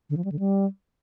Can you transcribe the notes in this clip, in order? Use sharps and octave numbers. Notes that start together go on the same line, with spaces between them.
D3
F3
G3
D3
G3